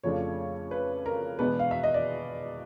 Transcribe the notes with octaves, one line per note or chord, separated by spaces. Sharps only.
F2 C#3 F3 A3 D4 C#5
B4
A#4
E2 B2 G#3 B3 D4 B4
F5
E5
D#5
D5